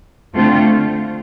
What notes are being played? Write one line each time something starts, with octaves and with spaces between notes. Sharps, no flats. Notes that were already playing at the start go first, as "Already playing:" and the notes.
D3 A3 C4 F4